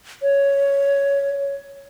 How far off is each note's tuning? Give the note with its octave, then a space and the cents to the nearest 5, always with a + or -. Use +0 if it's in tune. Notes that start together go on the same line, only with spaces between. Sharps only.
C#5 +10